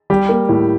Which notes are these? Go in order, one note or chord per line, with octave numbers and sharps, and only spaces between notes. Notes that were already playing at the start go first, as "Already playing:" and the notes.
G3 G4
A#3
A2